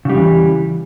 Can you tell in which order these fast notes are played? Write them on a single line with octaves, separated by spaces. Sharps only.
C#3 G3 E2 E3